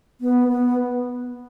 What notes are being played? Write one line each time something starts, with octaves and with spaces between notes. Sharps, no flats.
B3
B3